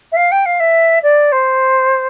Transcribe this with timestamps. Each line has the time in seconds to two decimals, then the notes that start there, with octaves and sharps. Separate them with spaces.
0.12 E5
0.16 F5
0.32 G5
0.46 F5
0.60 E5
1.03 D5
1.32 C5